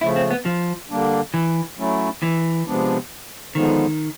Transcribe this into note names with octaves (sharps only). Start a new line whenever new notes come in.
C#3 F3 A3 E4
C4
B3
F3
D3 G3 A#3 D4
E3
F#3 A3 C#4 E4
E3
C3 F3 G#3 B3 D4
D3 D#3 F3 G#3 B3 D#4